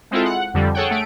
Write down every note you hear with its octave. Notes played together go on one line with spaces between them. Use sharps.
G#3 C4 E4 F4 A4
F#5
F2 D3 G3
G#4 A4 C#5 F#5 G5
A3 D7